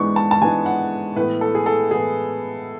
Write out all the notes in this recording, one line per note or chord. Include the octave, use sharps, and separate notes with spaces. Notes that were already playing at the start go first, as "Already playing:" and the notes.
Already playing: G#2 E3 G#3 B3 D4 C#6
A5
A5
G#2 E3 G#3 B3 D4 G#5
F#5
A2 E3 B3 B4
A4
G#4
A4
A2 E3 B3 G#4